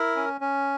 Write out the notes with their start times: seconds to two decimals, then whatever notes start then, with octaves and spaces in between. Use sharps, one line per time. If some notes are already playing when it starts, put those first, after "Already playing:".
Already playing: E4 A#4
0.16 C#4
0.41 C#4